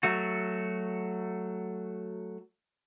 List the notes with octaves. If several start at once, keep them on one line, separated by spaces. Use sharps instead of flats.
F#3 A3 F#4